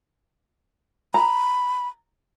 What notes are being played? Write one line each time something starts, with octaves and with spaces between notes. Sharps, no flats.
A#5 B5